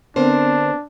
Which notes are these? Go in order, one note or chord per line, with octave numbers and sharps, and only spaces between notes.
D3 B3 C4 D4 A#4 C5